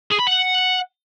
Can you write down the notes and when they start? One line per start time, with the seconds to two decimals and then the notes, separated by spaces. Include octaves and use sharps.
0.11 G#4
0.19 B5
0.27 F#5